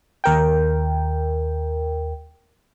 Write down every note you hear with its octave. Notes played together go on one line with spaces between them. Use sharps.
D#2 A#4 G5